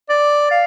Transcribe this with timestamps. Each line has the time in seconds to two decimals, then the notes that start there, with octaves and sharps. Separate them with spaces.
0.09 D5
0.51 F5